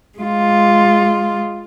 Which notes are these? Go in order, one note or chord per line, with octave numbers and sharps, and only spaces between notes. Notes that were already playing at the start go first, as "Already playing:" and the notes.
G#3 F4